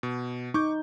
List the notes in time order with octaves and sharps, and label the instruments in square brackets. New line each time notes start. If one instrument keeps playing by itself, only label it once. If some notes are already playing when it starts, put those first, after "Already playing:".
[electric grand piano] B2
[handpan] D#4 [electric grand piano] C#6 D6 G6